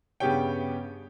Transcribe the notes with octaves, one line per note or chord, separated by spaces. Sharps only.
G2 C#3 B3 G4 C#5 G5